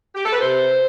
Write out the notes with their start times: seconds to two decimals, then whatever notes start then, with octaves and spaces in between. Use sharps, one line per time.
0.15 G4
0.24 A4
0.33 B4
0.40 C3 C5